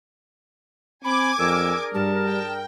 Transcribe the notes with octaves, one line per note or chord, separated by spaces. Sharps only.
C4 G#5 B5 D6 G#6
F2 D4 G#4 A#4 E6
G2 G3 A5
G5